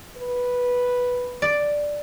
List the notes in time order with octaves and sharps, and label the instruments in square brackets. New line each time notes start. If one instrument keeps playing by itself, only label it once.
[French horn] B4
[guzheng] D5